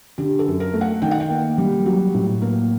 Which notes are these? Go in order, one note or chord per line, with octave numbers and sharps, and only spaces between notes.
D3 G4
A4
F#2
A#4
A3
F#5
D#3 G5
F#5
G5
A#3
G3
F#3
A2
A#3